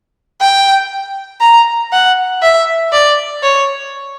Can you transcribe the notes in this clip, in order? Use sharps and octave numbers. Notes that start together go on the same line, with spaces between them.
G5
A#5
F#5
E5
D5
C#5